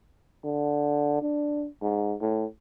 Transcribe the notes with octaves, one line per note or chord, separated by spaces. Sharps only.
D3
D4
G#2
A2